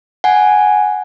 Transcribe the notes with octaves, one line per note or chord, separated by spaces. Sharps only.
F#5 G#5